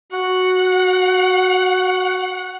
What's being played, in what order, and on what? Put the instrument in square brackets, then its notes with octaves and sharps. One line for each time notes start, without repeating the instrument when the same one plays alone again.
[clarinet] F#4 [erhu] F#5